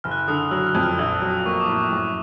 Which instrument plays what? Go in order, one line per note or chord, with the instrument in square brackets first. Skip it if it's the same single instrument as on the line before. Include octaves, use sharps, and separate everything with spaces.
[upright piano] F#1 [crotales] F6
[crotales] F#6
F6
[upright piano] D3 [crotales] D#6
[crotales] E6
D#6
[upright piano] F#3 [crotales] E6
[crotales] F6
[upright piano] F2
[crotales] F6
[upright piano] A#1 [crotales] E6
[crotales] E6
[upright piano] F#3
[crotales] D#6
[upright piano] A#3 [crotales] C#6
[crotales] D6
[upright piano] A2
[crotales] C#6
[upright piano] F#2